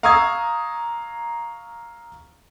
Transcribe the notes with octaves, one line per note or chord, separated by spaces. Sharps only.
F5 A#5 C#6 D#6 E6 G#6